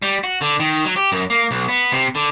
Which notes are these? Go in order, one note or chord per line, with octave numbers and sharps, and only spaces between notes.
G3
F#4
D3
D#3
F#3
G4
F#2
A#3
B1
B3
C3
D3